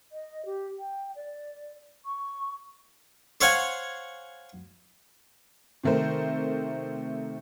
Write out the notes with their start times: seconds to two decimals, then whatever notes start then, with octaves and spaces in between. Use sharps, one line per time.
0.12 D#5
0.45 G4
0.79 G5
1.16 D5
2.05 C#6
3.41 C5 C#5 F5 F#5 G#5
5.84 C3 D#3 A3 A#4 C5